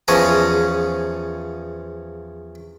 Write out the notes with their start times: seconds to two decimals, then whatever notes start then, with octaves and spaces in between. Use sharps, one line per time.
0.08 E2 F3 C#4 G#4 G#5 A#5